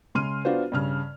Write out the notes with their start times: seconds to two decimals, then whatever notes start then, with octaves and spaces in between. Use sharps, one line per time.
0.15 C#3 G#3 C6 F6 D#7
0.45 B3 D4 F4 F#4 C5
0.72 G2 C#3 F6